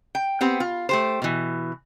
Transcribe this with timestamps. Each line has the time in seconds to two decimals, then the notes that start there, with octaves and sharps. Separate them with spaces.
0.15 G5
0.41 B3 C4 G4
0.60 F4
0.89 A3 G4 C5
1.22 B2 E3